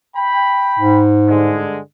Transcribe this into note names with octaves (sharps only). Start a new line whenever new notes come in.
G5 B5
G#2
G2 D3 G#3